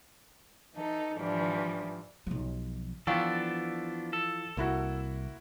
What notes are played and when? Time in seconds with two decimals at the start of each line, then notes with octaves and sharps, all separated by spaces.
0.75 E3 D#4 A4
1.17 G#2 E3 F3 G3 D4
2.27 B1 F3
3.07 E3 F3 B3 D4 A4 F5 G5 C#6
4.13 A4
4.57 C2 A#3 E4 F#4